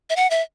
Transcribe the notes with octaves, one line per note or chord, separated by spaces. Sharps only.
E5
F#5
E5